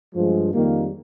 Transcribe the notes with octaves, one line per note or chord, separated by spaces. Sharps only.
G2 F3 G#3
F2 D#3 G3 A#3